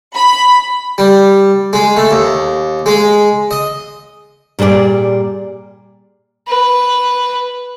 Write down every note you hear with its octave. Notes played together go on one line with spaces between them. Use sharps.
B5
G3
G#3
A3
D#2
G#3
D#5
A#2 G3 G#4 B4 D5
B4